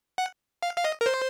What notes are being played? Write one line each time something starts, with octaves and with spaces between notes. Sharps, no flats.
F#5
F5
F5
D#5
A#4
C5